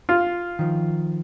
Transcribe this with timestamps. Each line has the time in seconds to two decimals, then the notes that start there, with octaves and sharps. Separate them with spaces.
0.09 F4
0.59 D#3 F3